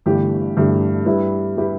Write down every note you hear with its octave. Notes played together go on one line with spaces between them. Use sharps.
G1 G2 E3 A3 G4
G1 G2 E3 A3 G4
G2 G3 E4 G4 B4
G3 E4 G4 B4